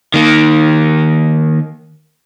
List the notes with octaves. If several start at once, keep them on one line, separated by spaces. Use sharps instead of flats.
D#3 A#3